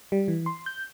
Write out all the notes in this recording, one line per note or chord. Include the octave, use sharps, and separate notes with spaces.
G3
E3
C6
G6